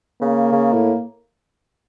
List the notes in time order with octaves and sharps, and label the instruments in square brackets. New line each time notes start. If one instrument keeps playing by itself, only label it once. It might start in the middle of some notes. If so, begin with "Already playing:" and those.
[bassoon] C#3 [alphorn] A#3
[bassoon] C#3
A2